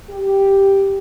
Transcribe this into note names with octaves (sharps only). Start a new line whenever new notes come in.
G4